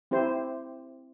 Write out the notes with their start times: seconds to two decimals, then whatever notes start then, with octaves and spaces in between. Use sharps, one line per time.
0.11 C4 E4 G4 C5